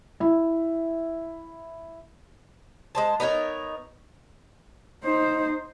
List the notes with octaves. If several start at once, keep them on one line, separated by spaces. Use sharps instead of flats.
E4 E5
G#3 C5 A5
B3 D#4 A#4 C#5
D#4 C5